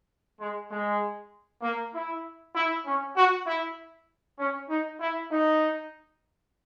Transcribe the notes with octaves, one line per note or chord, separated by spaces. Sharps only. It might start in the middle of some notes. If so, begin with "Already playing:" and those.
G#3
G#3
A#3
E4
E4
C#4
F#4
E4
C#4
D#4
E4
D#4